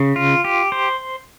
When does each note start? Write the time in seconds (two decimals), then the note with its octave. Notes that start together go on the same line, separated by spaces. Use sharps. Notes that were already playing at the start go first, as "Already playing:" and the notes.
Already playing: C#3
0.16 F4
0.44 G4
0.72 C5